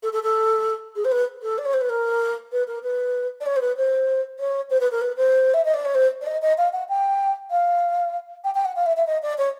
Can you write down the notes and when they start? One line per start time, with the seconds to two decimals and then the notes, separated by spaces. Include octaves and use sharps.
0.02 A4
0.12 A4
0.23 A4
0.95 G#4
1.04 C5
1.11 B4
1.42 A4
1.58 D5
1.65 C#5
1.73 C5
1.81 B4
1.89 A#4
2.52 B4
2.67 A#4
2.83 B4
3.40 D5
3.46 C#5
3.56 C5
3.61 B4
3.76 C5
4.39 C#5
4.70 C5
4.80 B4
4.91 A#4
5.01 B4
5.16 C5
5.53 E5
5.64 D#5
5.74 D5
5.85 C#5
5.94 C5
6.21 D5
6.26 D#5
6.42 D#5
6.57 F5
6.72 F#5
6.89 G5
7.50 F5
8.44 G5
8.54 G5
8.65 F#5
8.76 F5
8.86 E5
8.96 E5
9.06 D#5
9.22 D5
9.38 C#5